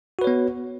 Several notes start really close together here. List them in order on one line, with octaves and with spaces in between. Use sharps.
F#4 B4 C#5 B3